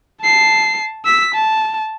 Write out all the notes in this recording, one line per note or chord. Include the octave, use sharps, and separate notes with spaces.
A5 C7
E6 B6
A5